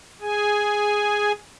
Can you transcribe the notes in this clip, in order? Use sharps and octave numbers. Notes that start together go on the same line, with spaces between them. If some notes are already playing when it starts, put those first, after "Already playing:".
G#4 G#5